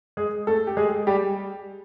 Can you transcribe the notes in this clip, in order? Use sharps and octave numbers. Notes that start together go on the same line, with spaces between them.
G#3 G#4
A3 A4
G4
G#3 G#4
G3 G4